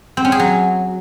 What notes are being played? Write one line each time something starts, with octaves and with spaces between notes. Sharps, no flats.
C4
C#4
G#4
F#3